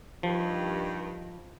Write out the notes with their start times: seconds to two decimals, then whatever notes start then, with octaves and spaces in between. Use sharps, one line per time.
0.23 G2 D#3 F3